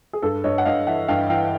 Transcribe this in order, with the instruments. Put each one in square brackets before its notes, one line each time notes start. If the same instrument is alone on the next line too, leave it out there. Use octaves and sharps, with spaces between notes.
[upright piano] G#4
G2 A4
G2 C#5 D#5
F#5
G2 D#5 F5
E3 E5 F#5
G2 F5 G5
E3 F5 G5